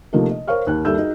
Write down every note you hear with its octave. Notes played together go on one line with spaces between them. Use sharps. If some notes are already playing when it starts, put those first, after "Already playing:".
C3 F3 A3 A#3 D#4 A4
D#5
A#4 C5 C#5 F5 C#6 F6
D#2 F#6
D#2 G3 A4 E5 E6 G6
D#4 F#4 G#4